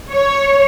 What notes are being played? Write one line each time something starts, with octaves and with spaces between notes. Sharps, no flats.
C#5